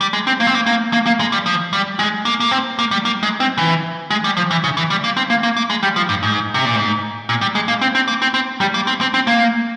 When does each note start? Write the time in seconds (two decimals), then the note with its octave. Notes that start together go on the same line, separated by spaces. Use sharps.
0.01 G3
0.13 G#3
0.27 C4
0.40 A#3
0.47 C4
0.55 A#3
0.66 A#3
0.93 A#3
1.06 A#3
1.20 G#3
1.32 G3
1.46 F3
1.73 G3
1.99 G#3
2.25 A#3
2.40 A#3
2.51 C4
2.79 A#3
2.91 G3
3.05 A#3
3.23 G#3
3.40 C4
3.58 E3
4.10 G#3
4.24 G3
4.37 F3
4.51 E3
4.64 C#3
4.77 E3
4.90 G3
5.04 A#3
5.17 C4
5.30 A#3
5.43 A#3
5.57 A#3
5.70 G#3
5.83 G3
5.96 F3
6.09 G2
6.23 G#2
6.54 C3
6.65 A#2
6.76 G#2
7.29 A#2
7.41 G3
7.55 G#3
7.68 A#3
7.81 C4
7.95 C4
8.08 A#3
8.22 C4
8.34 C4
8.61 G3
8.74 A#3
8.87 C4
9.01 C4
9.14 C4
9.27 A#3